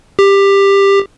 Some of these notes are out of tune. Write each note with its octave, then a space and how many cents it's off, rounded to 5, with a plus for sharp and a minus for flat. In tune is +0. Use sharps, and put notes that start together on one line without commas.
G4 +15